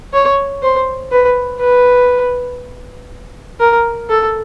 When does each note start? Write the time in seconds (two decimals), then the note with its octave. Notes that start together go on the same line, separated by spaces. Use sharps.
0.13 C#5
0.63 C5
1.11 B4
1.61 B4
3.60 A#4
4.09 A4